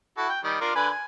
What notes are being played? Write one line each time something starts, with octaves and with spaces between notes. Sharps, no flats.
E4 F#4 A4
G5
D#3 G3
D4 F4 A#4
D3 B4 G#5
G#5